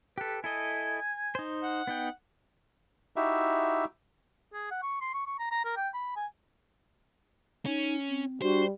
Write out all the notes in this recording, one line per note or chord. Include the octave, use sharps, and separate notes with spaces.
G4 A4 B4
E4 A4 D#5 G#5
D#4 C5
F#5
B3 D#4 G5
D#4 E4 F#4 G4 E5
G#4
F#5
C#6
C6
C#6
C#6
A#5
A#5
A#4
G5
B5
G#5
C#4 D#4
C4
G3 D4 F#4 C5